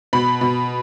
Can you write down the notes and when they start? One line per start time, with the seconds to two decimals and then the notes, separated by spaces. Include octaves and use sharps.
0.13 B2 B5
0.41 B2